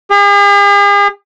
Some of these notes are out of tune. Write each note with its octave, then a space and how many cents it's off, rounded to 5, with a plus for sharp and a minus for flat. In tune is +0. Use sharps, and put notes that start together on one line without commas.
G#4 -45